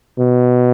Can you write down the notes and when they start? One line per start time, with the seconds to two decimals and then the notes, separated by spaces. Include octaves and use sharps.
0.19 B2